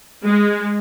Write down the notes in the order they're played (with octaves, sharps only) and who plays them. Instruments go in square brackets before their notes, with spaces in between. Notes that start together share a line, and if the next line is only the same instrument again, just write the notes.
[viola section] G#3